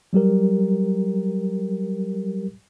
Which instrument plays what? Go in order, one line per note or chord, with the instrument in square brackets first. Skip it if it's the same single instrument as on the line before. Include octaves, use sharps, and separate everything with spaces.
[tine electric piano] F#3 G3 G4 A#4